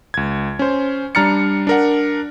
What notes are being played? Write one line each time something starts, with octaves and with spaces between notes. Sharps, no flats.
C#2 G#6
C#4 C5
G3 D4 A#5 F6 A6 C#7
D4 A#4 F#5